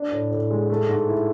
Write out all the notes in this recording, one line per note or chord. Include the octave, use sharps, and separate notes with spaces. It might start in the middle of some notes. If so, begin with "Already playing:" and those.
Already playing: D4
A2
A2
G#3
A3
G#2
E4